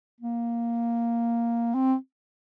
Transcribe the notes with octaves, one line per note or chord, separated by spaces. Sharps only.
A#3
C4